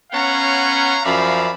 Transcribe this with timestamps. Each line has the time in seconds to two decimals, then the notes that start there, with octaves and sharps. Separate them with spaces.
0.12 B3 C#4 C#5 F5 F#5 A#5
1.04 F#2 F3 D5 E5 F5 B5